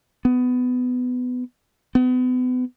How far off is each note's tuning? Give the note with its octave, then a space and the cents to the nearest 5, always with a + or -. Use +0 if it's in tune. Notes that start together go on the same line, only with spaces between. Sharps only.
B3 +20
B3 +35